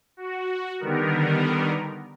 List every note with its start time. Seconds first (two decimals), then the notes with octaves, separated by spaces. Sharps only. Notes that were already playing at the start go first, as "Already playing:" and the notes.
0.17 F#4
0.79 D3 D#3 G3 B3 A#4